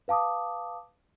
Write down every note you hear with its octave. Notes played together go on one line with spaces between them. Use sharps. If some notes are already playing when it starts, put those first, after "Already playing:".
B4 F5 A5 D6 D#6